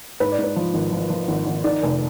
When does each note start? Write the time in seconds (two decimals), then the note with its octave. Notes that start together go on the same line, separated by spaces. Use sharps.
0.20 G#2 B4
0.32 D5
0.39 G#2
0.44 B4
0.56 F3
0.74 G#1
0.92 F3
1.10 F3
1.28 G#1
1.46 G#1
1.64 D#3 D5
1.83 F1